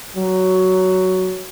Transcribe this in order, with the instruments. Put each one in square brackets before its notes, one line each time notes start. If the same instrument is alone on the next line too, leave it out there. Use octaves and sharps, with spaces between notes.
[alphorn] F#3